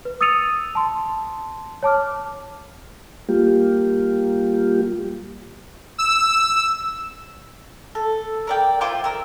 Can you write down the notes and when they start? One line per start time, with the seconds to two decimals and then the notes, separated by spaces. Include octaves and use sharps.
0.05 B4
0.21 D#6 E6 A6 C#7 D#7 F7
0.75 A5 C6
1.83 C#5 A5 D6 F6
3.29 G3 A#3 F4 G4
5.98 E6
7.95 A4
8.47 A#4 D5 G5
8.81 E4 F4 C5 D6
9.04 A#4 E6